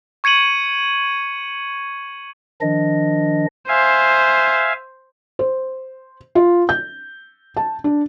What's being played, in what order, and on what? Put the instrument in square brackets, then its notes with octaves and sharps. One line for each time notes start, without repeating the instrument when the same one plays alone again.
[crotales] C#6 G#6 C#7 D#7 F#7
[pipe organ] D#3 F3 D4 D#5
[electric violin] C5 [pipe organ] E5 F5 G#5
[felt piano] C5
F4
G6
A5
D4